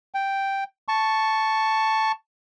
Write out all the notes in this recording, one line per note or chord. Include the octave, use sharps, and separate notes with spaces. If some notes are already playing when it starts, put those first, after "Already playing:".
G5
A5 C#6